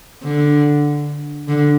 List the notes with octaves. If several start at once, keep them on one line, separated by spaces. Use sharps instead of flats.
D3
D3